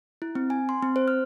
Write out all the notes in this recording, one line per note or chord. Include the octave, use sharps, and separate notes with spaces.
E4
C4
G#5
C6
C4
C5
F6